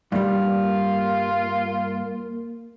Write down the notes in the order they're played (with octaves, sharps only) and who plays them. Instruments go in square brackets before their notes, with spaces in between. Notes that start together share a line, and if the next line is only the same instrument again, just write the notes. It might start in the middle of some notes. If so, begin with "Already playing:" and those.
[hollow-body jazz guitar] G2 G3 [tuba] A#3 [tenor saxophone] F4